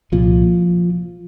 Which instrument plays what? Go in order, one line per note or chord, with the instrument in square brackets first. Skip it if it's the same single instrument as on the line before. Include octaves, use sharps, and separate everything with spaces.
[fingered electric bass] C2 A#2 F3